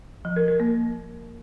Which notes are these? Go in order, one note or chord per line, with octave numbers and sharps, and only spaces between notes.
F3
A#4
A#4
A#3